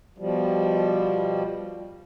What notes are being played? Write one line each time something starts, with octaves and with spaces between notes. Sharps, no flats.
B2 F3 G3